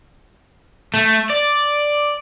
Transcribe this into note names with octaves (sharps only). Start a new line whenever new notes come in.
A3
D5